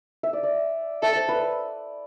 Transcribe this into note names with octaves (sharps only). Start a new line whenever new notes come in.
E5
D5
D5
A4 E5
C5
B4